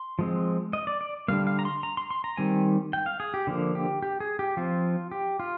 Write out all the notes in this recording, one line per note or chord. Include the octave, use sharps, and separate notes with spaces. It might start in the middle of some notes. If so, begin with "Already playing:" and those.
Already playing: C6
F3 G#3 C4
D#5
D5
D5
D3 G3 A#3 F5
F5
A#5
C6
A#5
C6
C6
A#5
D#3 G3 C4 G#5
G5
F5
G#4
G4
D3 F3 A#3
G4
G4
G#4
G4
F3 C4 F4
G4
F4